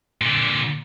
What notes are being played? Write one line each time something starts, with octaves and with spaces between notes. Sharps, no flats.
A#2 D3